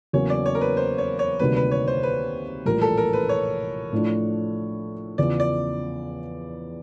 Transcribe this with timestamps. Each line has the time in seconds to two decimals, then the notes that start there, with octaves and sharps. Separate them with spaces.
0.13 E2 C#3 F#3 A#3 C#4 C#5
0.30 D5
0.46 C#5
0.55 A#4
0.61 B4
0.77 C5
0.98 C#5
1.19 C#5
1.39 D2 C3 D#3 G3 A#3 B4
1.56 B4
1.71 C#5
1.88 C5
2.03 B4
2.66 A#1 A2 E3 G3 A#4
2.82 A4
2.97 A#4
3.13 B4
3.29 C#5
3.93 A2 F3 A3 D4
5.18 E2 C#3 F3 D5
5.40 D5